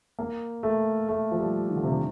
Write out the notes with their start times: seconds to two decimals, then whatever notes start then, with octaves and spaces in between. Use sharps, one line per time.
0.19 A#3
0.63 A3
1.09 A3
1.31 F3
1.38 G3
1.69 D#3
1.76 D3
1.83 C3
1.91 D3